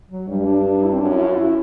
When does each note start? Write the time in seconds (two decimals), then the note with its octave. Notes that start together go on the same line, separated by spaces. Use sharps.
0.10 F#3
0.28 G2 G3
0.46 D4
0.64 D4
0.77 D4
0.83 E4
0.92 C4
1.00 F#2 D4
1.13 E4
1.25 F#4
1.36 E4